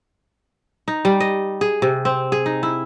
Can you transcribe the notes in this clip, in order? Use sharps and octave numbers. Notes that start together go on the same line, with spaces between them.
D#4
G3
D#5
G#4
C3
C4
G#4
D#4
E4